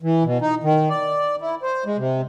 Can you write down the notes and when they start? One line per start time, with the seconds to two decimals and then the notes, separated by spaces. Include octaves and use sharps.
0.03 E3
0.24 B2
0.41 D#4
0.64 D#3
0.90 D5
1.41 E4
1.62 C5
1.86 G#3
1.98 C3